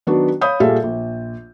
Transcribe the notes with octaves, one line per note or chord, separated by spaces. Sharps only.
D#3 F#3 B3 D4 F#4
C#5 F5 B5 D#6 G6
A#2 G3 G#4 A4 E5 F5
A#1